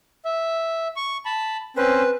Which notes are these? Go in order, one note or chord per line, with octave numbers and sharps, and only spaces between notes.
E5
C#6
A5 B5
C4 C#4 B4 C5